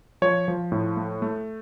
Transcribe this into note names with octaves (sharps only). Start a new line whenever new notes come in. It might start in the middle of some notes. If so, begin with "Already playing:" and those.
F3 C#5
F3
A2
A3
A3